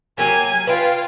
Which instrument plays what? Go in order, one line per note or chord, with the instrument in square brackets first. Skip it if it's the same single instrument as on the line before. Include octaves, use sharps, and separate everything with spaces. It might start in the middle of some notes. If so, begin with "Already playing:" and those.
[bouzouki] F#3 A#3 G4 [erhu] G#5
[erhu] F4 [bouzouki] B4 G5